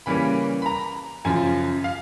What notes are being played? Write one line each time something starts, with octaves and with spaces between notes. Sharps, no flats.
C#3 E3 G3 A#3 C#4 B5
B5
A#5
F#2 C#3 F3 G#5
F5